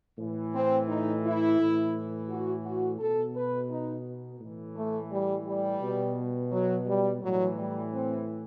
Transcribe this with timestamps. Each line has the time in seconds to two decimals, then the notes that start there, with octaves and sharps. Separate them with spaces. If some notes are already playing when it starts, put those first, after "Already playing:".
0.18 A2 E3
0.54 C4
0.88 D#4
1.24 E4
1.58 A2 E3
2.29 F#4
2.64 F#4
2.99 B2 A4
3.35 B4
3.70 D#4
4.40 A2 E3
4.75 A3
5.11 G3
5.46 G3
5.80 B2
6.51 F#3
6.87 G3
7.22 A2 E3 F#3
7.57 G3
7.93 C4